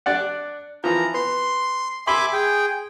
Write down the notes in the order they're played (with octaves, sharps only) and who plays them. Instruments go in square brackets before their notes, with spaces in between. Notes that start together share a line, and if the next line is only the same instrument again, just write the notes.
[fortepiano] D4 D5 F#5
[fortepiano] E3 F3 [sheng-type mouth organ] A#5
[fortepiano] B3 [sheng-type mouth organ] C6
[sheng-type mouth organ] E5 G#5 D6 [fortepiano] B5 C6
[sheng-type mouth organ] G#4 G5